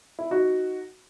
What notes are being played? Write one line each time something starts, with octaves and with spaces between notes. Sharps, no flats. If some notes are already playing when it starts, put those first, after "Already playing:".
E4
D#4 F#4